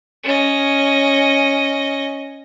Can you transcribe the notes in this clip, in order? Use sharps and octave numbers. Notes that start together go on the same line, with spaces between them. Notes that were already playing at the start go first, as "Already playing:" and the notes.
C#4 D#5